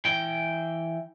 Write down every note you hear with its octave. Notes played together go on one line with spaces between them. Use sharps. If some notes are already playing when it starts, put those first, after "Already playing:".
E3 G5